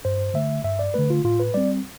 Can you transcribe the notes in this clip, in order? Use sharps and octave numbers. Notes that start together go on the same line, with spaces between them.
G2 C5
D3 A3 E5
G2 E5
D5
D3 A3 B4
F4
A2 F4
B4
G3 C4 D5